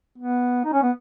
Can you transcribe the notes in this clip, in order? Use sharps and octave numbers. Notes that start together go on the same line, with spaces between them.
B3
D#4
C#4
B3